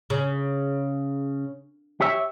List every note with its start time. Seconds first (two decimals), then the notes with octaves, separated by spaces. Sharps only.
0.10 C#3
2.01 G4 C#5 E5